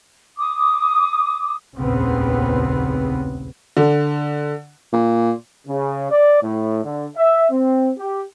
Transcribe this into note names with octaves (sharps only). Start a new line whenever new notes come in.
D6 D#6
F1 A#1 D#2 C#3 B3 C4
D3
A#2
C#3
D5
A2
D3
E5
C4
G4